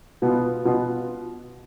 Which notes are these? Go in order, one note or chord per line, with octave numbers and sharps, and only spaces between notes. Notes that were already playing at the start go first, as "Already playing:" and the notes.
B2 B3 F4
B2 B3 F4